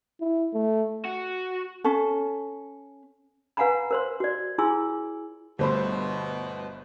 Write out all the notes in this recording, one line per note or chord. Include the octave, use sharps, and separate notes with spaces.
E4
A3
F#4
C#4 A4
B4 F5 F#5 G#5 A#5 B5
A#4 C5 C6
F#4 D5
E4 F4 G#4 G#5 C6 E6
G1 B2 D3 G3 A3 C5 B5